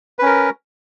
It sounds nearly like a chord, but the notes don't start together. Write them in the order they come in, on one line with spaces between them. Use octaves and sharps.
B4 C#4 A#4